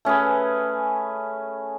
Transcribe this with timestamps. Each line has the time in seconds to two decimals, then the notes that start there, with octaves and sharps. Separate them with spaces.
0.05 A3 C#4 G#4 B4